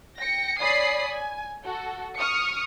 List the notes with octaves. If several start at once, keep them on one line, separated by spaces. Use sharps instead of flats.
G5 A#6 C#7
C#5 D5 G#5 B5 D#6 C7
G#5
F#4 A4
C#6 D#6 F6 C#7